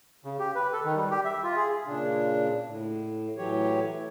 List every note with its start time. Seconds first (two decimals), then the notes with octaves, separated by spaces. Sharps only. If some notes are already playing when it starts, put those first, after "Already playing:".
0.25 C#3
0.40 G4
0.55 B4
0.73 A4
0.84 D#3
0.96 G3
1.11 G4
1.25 E5
1.43 F4
1.56 G#4
1.86 A#2 C#3 D4
2.66 A2
3.37 A2 E3 F#3 G4 C#5